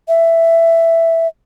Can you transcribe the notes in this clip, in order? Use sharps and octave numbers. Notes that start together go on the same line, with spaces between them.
E5